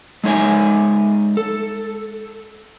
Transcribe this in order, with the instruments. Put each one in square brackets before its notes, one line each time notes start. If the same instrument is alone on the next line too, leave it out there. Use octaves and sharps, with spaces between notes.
[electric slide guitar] G#3 A3 D#4 C#5 E5 G#5
A4